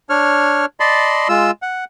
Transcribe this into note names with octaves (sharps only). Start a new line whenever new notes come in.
D4 C#5 F6
D5 D#5 A5 B5 C6
G#3 F4 E6
F#5